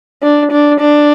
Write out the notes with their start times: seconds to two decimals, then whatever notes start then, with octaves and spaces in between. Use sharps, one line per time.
0.23 D4
0.52 D4
0.80 D4